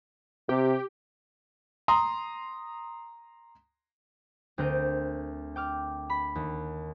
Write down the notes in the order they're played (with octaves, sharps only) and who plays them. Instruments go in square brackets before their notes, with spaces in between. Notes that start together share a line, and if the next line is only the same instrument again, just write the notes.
[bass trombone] C3 [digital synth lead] G4
[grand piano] A#5 C6 D#6
[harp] D2 C4 A#4 G6 D7 D#7
G5 D6 F6
B5
D#2